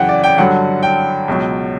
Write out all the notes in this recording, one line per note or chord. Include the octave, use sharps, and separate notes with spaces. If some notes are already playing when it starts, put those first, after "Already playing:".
Already playing: F#2 C#3 E3 F#5 G5
D5
G5
G2 D3 F#3 F#5
G5
C#2 B2 F#3